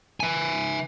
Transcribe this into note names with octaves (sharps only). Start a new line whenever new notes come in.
E5 G#5